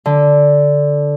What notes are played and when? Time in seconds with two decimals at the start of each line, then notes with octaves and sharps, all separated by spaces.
0.06 D3